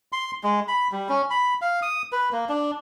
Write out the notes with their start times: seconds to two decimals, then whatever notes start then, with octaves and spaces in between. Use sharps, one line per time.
0.12 C6
0.43 G#3
0.68 B5
0.92 G3
1.09 C#4
1.30 B5
1.62 F5
1.82 D#6
2.12 B4
2.32 A#3
2.49 D4